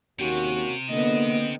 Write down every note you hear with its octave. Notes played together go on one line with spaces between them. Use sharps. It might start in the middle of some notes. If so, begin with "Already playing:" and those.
D#2 C3 A#3 C#4 F#4
D3 A#3 B3 D#5